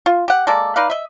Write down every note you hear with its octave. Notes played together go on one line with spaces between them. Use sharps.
F4
G4 F#5
G#3 A#3 A4 D5
D#4 B4 D5 F5
D#5 E5